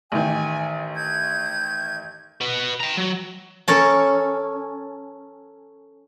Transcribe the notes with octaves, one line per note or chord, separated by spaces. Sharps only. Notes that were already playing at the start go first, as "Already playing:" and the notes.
A1 D#3 G#5
G6 G#6
F#4 B4
G5 A#5
F#3
C#4 A4 A#4 C#5 A5